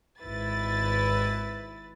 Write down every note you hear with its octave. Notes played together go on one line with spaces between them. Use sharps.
G#1 E4 B4 A6